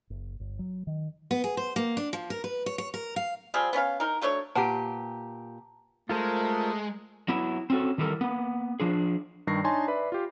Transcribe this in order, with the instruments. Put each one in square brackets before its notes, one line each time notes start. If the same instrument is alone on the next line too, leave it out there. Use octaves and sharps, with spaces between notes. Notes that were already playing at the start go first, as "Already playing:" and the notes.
[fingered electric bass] F#1
G1
F#3
D#3
[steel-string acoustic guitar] B3
G#4
C5
A#3
D4
F3
A#4
B4
C#5
C#5
A#4
F5
[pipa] F3 G3 C4 G#4
B3 C#4 A#4 F5
D#4 A#4
F#3 A3 D4 C#5
[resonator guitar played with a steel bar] A#2 G4 [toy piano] B4 F#5 [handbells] A5 A#5
[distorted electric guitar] G#3 [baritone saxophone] A3 [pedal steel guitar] F4 A#4 C5
[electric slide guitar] F#3 B3 E4
C4 C#4 F#4 A4
D#3 E3 G3 A4 A#4
A#3 B3
F3 D4 G#4
[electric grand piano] G2 D#3 G3 C#6 A#6 C7
D4 D#4 C#5 G#5 A5 C6
B4 D5 E5 B5
F4 G4